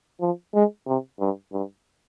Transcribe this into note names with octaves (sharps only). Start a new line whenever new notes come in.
F3
G#3
C3
G2
G2